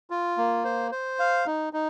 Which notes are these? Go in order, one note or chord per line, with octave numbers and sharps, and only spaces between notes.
F4
A#3
C5
C5
F5
D#4
D#4